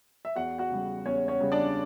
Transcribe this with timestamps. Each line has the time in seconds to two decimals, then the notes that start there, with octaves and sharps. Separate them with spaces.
0.25 E5
0.36 E2 F#4 F#5
0.58 F#4 F#5
0.71 C#3 G3
1.06 E2 C#4 C#5
1.28 C#4 C#5
1.40 C#3 G3
1.52 D4 D5